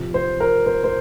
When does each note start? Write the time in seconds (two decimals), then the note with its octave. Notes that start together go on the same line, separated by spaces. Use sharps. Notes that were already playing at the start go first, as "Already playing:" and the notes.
Already playing: C3 F3
0.14 C5
0.40 A#4
0.66 C5
0.84 C5